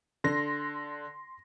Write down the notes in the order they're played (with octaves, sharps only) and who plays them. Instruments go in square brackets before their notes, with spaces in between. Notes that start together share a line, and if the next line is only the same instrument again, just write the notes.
[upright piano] D3 [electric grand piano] C6 A#6